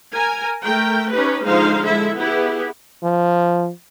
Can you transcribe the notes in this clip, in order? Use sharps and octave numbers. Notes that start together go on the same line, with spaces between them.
A#4 G#5
A3 A#4 G5
C#4 D#4 G4 B4
D3 F3 G#3 D#4 C5 F5
G#3 E4 A4 E5
B3 E4 G4 G#4
F3